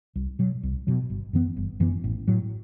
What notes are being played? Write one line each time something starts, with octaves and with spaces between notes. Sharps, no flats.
C2
B2 F#3
C2
B2 F#3
G1
F#2 E3 B3
G1
F#2 E3 B3
A1
A2 F#3